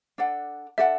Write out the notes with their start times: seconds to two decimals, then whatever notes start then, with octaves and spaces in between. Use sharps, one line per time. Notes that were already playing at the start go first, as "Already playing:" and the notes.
0.18 D4 A4 D5 F#5
0.78 D4 A4 D5 E5 F#5